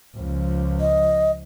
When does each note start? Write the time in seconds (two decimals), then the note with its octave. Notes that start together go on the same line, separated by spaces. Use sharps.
0.17 C#2 F3
0.80 D#5